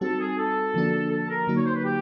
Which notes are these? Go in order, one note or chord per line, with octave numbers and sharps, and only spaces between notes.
G3 C4 D#4 F#4 A4
G#4
A4
D3 F3 A#3 D4 F#4
A4
A#4
D3 F#3 A#3 D#4 F#4
C#5
C5
B4
G4